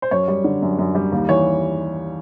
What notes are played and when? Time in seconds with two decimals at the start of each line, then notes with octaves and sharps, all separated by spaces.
0.02 C5
0.11 F#2 C#5
0.28 G3
0.44 D3
0.62 F#2
0.79 F#2
0.95 G3
1.12 D#2
1.29 E3 C#5